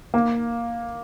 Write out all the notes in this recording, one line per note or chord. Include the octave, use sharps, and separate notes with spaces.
A#3